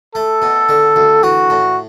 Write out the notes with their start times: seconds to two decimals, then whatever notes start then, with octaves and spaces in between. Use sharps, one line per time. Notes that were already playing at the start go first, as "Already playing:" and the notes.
0.15 A3 A4
0.42 B2
0.69 D3
0.96 D2
1.23 E3 F#4
1.50 A2